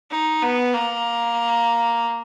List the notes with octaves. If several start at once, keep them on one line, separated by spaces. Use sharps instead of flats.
D#4
B3
A#3